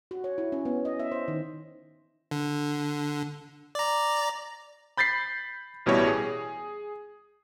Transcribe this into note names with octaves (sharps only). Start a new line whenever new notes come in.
F#4
C#5
E4
C#4
B3
D#5
E5
C5
D#3
D3
D5 A#5
B5 G6 A6 B6 C7
A1 B2 G3 E4 C#5
G#4